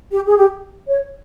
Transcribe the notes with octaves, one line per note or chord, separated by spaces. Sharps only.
G4
G#4
G4
C#5